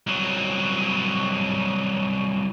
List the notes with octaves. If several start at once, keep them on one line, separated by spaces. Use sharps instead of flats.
C2 F#3